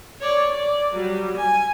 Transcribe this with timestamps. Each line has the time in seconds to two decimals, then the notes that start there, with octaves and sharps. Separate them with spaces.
0.21 C#5 D5
0.51 D5
0.94 F#3 G3
1.37 G#5